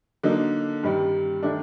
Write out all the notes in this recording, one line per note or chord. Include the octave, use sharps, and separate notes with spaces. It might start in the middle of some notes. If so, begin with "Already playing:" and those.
D3 F#3 A#3 D#4
G2 D#3 G3
D#3 A3 D4